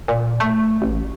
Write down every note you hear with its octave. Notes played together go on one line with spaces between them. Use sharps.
A#2
A3
A1